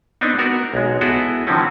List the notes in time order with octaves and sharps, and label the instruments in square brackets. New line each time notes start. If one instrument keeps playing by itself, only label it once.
[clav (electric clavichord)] B3 C4 D4 D#4
B3 F#4 A#4
B1 G#3
B3 E4 F#4 G#4 A4
D3 D#3 F3 C4 C#4